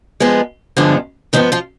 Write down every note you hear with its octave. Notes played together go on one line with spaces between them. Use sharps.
G2 F3 G#3 B3
G2 D3 F3 G#3 B3 D4
G#2 D#3 F3 B3 D#4
F3 F4